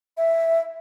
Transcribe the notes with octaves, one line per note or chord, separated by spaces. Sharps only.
E5